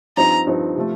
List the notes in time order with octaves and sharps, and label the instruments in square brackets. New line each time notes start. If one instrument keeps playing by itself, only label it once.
[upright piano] G2 F3 C4 D#4 [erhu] A#5
[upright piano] G2 F3 C4 D#4
C3 F3 A3